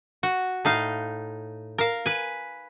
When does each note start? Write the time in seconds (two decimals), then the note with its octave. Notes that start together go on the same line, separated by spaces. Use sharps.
0.23 F#4
0.65 A2 D#4 F5
1.78 A#4 F5
2.06 B4 G#5